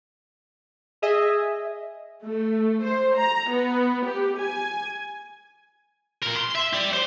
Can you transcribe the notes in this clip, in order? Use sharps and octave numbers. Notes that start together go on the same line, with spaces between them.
G#4 D#5 E5
A3
C5
A#5
B3
G4
G#5
A#2 A#4
C6
E5
G4 D5
C5